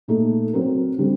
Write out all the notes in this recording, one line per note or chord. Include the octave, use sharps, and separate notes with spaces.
A#2 A3 D#4 A4
F#3 C4 F#4 A#4
D3 G3 C4